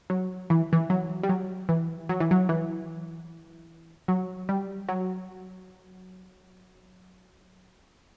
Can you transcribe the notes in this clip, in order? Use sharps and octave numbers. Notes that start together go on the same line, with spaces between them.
F#3
E3
E3
F#3
G3
F#3
E3
F#3
E3
F#3
E3
F#3
G3
F#3